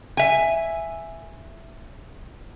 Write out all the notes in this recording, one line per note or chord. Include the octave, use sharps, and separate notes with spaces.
E5 G#5